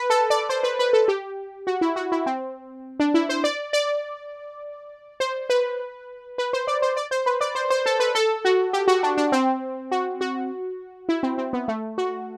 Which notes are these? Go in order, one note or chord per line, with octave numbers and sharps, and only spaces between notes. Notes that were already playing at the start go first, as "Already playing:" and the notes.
Already playing: B4
A4
D5
C5
B4
B4
A4
G4
F#4
E4
F#4
E4
C4
D4
E4
C5
D5
D5
C5
B4
B4
C5
D5
C5
D5
C5
B4
D5
C5
C5
A4
B4
A4
F#4
G4
F#4
D4
D4
C4
F#4
F#4
E4
C4
C4
B3
A3
F#4